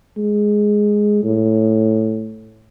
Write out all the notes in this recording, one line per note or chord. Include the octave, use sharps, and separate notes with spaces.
G#3
A2